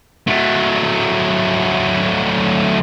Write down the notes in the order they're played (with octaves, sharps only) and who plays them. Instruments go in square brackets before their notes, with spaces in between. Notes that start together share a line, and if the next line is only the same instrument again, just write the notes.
[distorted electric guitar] F#3 A3